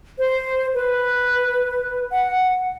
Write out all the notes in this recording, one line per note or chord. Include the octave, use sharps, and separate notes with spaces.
C5
B4
F#5